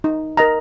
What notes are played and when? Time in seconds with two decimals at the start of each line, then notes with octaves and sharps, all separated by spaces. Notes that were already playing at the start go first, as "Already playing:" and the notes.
0.04 D#4
0.37 A#4 D#5 A#5